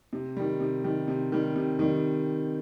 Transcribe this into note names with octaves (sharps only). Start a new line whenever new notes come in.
C3
D#3 G3
C3
D#3 G3
C3
D#3 G3
C3
D#3 G3